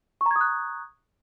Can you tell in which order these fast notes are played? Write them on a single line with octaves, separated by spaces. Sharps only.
C#6 A#5 G#6 D#6 F#6